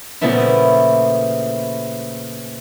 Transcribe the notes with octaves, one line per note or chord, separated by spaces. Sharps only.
A#2 C#3 F3 A3 B3 E4